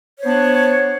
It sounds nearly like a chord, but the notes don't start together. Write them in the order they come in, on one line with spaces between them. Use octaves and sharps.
C#5 C5 B3 D4